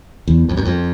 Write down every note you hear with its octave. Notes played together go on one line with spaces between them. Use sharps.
E2
F2
F#2
F2